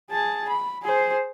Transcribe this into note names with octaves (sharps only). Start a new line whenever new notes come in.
G#4 A5
B5
G#4 C5